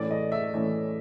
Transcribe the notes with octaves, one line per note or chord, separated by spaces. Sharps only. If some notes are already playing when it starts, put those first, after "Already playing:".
Already playing: A2 E3 A3 C#4 D5
D#5
E5
A2 E3 A3 C#4